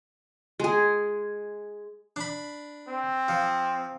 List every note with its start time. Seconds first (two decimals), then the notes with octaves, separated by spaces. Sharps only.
0.60 G#3 G#4
2.16 D4 B5
2.88 C4
3.28 F3